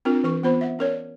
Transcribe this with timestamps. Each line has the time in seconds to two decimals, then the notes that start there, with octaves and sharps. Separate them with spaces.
0.05 C4 D4 F4 A#4
0.24 E3 A#4 C#6
0.43 E3 B3 F4 C5 B5
0.61 E5 F#5
0.79 C#4 A#4 C#5 D5